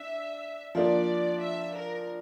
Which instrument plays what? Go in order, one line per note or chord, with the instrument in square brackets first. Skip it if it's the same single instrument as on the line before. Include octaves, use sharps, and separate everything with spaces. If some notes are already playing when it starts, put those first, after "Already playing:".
Already playing: [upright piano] D4 [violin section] E5
[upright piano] F3 A#3 D4 [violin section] D5
[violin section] E5
A#4